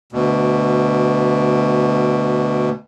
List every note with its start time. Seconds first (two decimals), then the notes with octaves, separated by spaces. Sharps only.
0.13 D2 B2